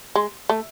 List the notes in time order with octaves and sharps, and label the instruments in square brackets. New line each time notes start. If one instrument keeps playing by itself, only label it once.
[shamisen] G#3
A3